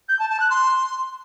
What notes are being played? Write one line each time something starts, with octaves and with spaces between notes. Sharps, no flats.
G6
A5
A5
F#6
C6